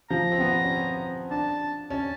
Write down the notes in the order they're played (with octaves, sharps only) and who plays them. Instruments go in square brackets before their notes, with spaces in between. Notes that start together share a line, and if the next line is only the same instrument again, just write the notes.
[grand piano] F3 [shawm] A#5
[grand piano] C4
B3
C#4
C4
[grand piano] D4 [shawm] A5
[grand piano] C#4 [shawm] A5